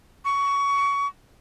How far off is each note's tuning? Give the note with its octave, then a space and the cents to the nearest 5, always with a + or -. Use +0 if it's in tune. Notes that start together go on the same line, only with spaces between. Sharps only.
C#6 +20